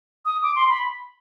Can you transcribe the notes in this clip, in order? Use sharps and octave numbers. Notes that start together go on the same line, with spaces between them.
D#6
D6
C6
B5